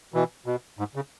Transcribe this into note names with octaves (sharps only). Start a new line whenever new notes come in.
B2 E3
B2
G#2
C#3